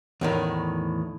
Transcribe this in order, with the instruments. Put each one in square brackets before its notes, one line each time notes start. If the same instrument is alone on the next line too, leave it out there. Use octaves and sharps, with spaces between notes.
[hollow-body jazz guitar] E2 A2 D#3